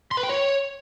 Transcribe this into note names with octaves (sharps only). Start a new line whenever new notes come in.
C6
B4
G5
C#5